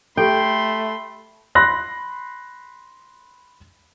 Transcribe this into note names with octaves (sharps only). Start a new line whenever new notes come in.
A3 G4 A4 G5 B5 C6
B5 C6 F#6 A#6